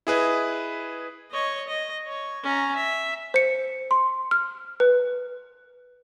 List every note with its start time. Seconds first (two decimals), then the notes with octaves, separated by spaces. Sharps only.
0.07 E4 G#4 B4 D#5
1.31 C#5 D#5
1.67 D#5
2.07 C#5
2.44 C#4 A#5
2.75 E5
3.34 C5 C#7
3.91 C6
4.31 F6
4.80 B4